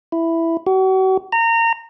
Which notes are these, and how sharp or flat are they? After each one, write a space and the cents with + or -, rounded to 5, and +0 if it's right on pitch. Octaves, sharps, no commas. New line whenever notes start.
E4 +5
F#4 +40
A#5 -25